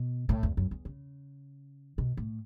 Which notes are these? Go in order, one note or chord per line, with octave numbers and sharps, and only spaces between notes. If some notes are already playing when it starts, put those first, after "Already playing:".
Already playing: B2
A2
E2
F#2
E2
C#3
B2
A2